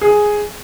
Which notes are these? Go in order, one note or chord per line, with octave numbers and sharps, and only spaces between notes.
G#4